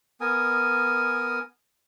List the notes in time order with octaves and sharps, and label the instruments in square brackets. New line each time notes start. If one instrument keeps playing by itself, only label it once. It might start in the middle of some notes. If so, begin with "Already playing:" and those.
[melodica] B3 A#4 G#5 D#6